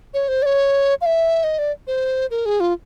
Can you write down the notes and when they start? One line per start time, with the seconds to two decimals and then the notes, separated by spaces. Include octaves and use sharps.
0.14 C#5
0.28 C5
0.42 D5
0.46 C#5
1.01 F5
1.06 E5
1.44 D#5
1.59 D5
1.87 C5
2.31 A#4
2.46 G#4
2.60 F4